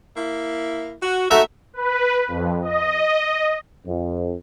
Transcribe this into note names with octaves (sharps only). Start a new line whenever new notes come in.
A#3 E4
F#4
A3 D#4 F#4 E5 A#5
B4
F2
D#5
F2